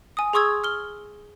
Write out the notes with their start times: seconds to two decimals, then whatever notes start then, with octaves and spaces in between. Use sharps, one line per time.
0.17 G#5 D#6
0.33 G#4 C6 C#6 D#6 E6 G#6
0.64 F6 G7